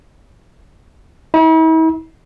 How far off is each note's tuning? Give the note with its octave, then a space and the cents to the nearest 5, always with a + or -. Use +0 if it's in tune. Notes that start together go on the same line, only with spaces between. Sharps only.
E4 -45